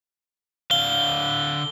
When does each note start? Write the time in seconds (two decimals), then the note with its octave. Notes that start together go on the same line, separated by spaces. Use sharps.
0.71 D3 F5 G7